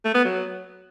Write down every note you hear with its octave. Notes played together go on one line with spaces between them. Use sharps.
A3
B3
F#3